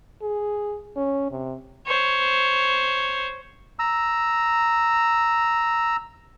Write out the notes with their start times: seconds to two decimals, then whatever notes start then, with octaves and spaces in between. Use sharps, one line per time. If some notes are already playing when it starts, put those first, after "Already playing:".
0.22 G#4
0.96 C#4
1.31 C3
1.87 C5 C#5
3.79 A#5 E6